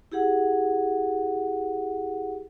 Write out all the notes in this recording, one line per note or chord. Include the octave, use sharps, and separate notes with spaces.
E4 G4 G#4 F#5